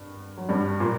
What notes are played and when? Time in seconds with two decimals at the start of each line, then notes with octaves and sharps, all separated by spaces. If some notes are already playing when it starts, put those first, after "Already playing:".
Already playing: G2
0.37 F#3
0.49 G2 G3
0.80 A#2 A#3